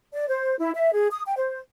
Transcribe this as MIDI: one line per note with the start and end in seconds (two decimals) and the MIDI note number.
0.14 0.27 74
0.28 0.56 72
0.59 0.70 64
0.75 0.93 76
0.93 1.07 68
1.13 1.22 87
1.25 1.33 79
1.37 1.59 72